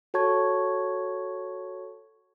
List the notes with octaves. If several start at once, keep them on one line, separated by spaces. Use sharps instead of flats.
F#4 A4 C#5 A5 C#6 G#6